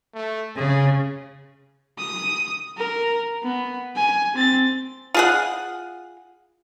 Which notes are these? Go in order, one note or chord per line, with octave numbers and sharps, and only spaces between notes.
A3
C#3 G#4
D#6
A#4
B3
G#5
C4 A6
F4 G#4 F#5